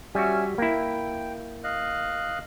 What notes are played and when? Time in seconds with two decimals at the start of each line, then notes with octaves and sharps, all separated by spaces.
0.15 G3 C#4 F#4 E5 G#5
0.58 A#3 E4 G5
1.64 D#5 F5 F#6